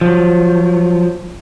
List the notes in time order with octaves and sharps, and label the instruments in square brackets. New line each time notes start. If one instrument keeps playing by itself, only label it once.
[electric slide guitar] F3 F#3